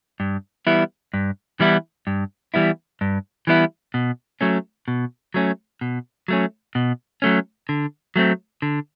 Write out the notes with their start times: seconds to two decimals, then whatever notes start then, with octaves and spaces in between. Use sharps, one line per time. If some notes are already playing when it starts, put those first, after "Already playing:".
0.20 G2
0.67 E3 G3 B3 E4
1.14 G2
1.60 E3 G3 B3 E4
2.07 G2
2.54 E3 G3 B3 E4
3.01 G2
3.47 E3 G3 B3 E4
3.94 B2
4.41 F#3 A3 C#4
4.88 B2
5.34 F#3 A3 C#4
5.81 B2
6.28 F#3 A3 C#4
6.75 B2
7.22 F#3 A3 C#4
7.69 D3
8.16 F#3 A3 C4
8.62 D3